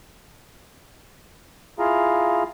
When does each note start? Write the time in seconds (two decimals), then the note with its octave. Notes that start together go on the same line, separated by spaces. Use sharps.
1.79 E4 F4 G#4 F5 A#5